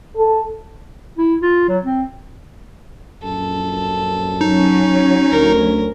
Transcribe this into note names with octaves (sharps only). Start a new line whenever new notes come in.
A4
E4
F4
F#3
C4
A#1 F#2 A4
F#3 C#4 D#4
D2 A#4